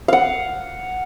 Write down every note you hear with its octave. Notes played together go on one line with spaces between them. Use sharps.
F5 F#5